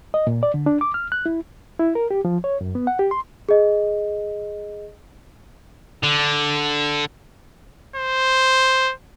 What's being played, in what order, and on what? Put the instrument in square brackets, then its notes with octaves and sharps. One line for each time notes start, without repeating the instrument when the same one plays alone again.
[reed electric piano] D#5
A#2
D5
D3
D4
D6
F6
F#6
E4
E4
A#4
G4
F3
C#5
F#2
B3
F#5
G4
C6
[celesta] G#4 D#5
[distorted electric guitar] D3
[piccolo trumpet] C5